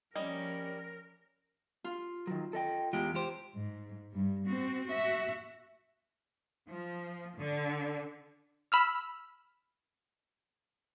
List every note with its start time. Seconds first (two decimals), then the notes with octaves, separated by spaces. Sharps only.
0.15 F3 G3 A#3 C#4 A#4 D#5 A#6
1.84 F4
2.27 D#3 F#3
2.53 A4 D#5 G5
2.93 E2 G#3 F4 G4
3.15 G4 C5
3.55 G#2
4.11 G2 G3
4.46 C4 F#4
4.87 F#4 E5
6.69 F3
7.38 D3
8.72 B5 E6 F6